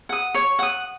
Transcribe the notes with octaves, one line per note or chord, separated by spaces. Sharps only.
F#5 D#6
C#5
F#5 D#6